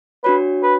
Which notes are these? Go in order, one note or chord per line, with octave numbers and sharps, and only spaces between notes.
D4 F#4 B4 C#5
B4